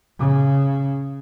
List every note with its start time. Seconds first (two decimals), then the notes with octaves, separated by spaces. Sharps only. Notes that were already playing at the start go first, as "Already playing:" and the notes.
0.19 C#3